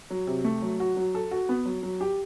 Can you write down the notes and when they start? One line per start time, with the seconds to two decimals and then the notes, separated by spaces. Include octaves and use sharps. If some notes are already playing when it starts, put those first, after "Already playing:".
0.10 F#3
0.27 C3
0.44 A3
0.62 F#3
0.80 F#4
0.97 F#3
1.15 A4
1.31 F#4
1.49 B3
1.66 F#3
1.83 F#3
2.01 G4